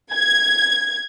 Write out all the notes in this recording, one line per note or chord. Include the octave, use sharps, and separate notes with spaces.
G#6